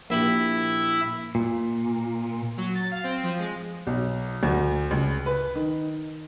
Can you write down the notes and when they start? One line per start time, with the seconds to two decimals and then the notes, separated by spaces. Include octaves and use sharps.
0.10 A#1 E4 G4 E5 B5
1.35 A#2
2.58 F#3
2.75 A6
2.92 F5
3.04 C4
3.23 F3
3.39 G#3
3.87 B1
4.43 D2
4.91 C#2
5.26 B4
5.55 D#3